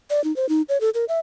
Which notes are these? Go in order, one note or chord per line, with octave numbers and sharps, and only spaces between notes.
D5
D#4
C5
D#4
C#5
A4
A#4
E5